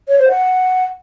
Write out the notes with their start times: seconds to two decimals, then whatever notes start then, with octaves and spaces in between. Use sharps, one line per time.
0.08 C#5
0.19 C5
0.29 F#5